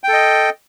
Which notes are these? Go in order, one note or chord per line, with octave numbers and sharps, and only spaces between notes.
A4 D#5 G5